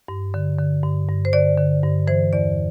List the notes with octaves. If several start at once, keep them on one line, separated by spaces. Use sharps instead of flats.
G2
D3
D3
G2
G2
C5
D3 D5
D3
G2
E3 C5
E2 D5